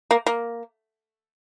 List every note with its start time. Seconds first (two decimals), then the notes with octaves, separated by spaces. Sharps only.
0.11 A#3
0.26 A#3